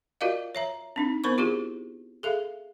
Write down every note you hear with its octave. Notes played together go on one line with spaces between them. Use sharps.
F4 F#4 A#4 D5 D#5 F5
C#5 E5 A#5
C4 D4 D#4
B3 A#4 C5 B5 C#6
E4 F4 G4 G#4
G#4 A4 E5 F5